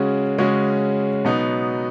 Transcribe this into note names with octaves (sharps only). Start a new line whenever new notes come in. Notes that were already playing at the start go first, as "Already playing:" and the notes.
Already playing: C#3 G#3 C#4 F#4
C#3 G#3 C#4 F#4
B2 F#3 B3 D#4